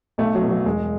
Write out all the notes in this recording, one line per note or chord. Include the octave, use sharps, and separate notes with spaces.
B1 A3
F#3
B2
F#3
E1 G#3